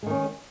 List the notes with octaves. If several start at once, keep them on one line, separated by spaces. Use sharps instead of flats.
D#3 G#3 C#4